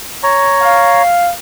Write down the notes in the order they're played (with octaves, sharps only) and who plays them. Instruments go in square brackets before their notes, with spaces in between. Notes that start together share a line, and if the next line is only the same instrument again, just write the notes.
[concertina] C#5 A#5
[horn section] F5